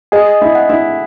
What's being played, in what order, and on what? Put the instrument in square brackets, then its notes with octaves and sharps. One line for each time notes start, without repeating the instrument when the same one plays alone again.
[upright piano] G#4 [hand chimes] D#5
[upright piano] E4
[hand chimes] F#5
[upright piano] E4